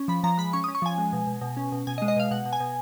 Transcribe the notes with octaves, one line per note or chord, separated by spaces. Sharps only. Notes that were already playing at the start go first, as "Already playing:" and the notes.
Already playing: C#4
F3 B5
F3 A#5
G#3 B5
C#4 C#6
C#4 D#6
C#6
F3 G#5
G#3
B2
B2
B2
C#4
B2
B2 G#5
D#5
G#3
D#5
B2 F5
B2 F#5
B2
G#5
B2